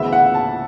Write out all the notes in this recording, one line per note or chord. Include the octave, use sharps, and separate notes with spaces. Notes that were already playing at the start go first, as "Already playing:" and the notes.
Already playing: D2 C#3 E3 B3 E5
F#5
A5